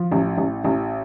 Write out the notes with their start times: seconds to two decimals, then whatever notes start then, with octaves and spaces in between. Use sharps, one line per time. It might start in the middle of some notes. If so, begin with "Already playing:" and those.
Already playing: F3
0.12 A1
0.38 A1
0.64 A1